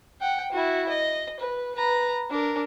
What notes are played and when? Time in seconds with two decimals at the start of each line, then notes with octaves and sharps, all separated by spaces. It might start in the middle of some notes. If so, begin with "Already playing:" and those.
0.21 F#5 G5
0.52 E4 F#4
0.89 D#5
1.40 B4
1.75 B4 A#5
2.30 D4 A#4